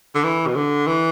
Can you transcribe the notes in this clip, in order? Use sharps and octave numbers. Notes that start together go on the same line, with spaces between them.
D3
E3
B2
D3
E3